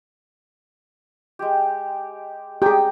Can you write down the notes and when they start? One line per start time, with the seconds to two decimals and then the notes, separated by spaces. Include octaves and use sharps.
1.39 G#3 G4
2.62 G4 G#4 G5 G#5 A#5